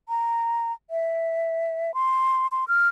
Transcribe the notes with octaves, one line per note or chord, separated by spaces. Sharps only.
A#5
E5
C6
C6
F6